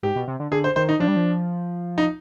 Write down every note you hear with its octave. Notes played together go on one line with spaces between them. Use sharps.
G#2 G4
B2
C3
D3
D3 G#4
C5
D#3 C5
D#4
F3 D4
G3
F3
D#4